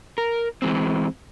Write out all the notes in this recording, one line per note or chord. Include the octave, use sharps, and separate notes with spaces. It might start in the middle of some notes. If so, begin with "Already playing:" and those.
A#4
E3 G#3 C4